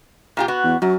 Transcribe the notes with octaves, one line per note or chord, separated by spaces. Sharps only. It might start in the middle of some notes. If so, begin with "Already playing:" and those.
A#2 F4 G4
B3 F#4
E2
F#2 F#3